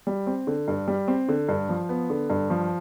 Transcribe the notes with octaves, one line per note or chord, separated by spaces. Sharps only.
G3
C4
D3
G2
G3
C4
D3
G2
F3
B3
D3
G2
F3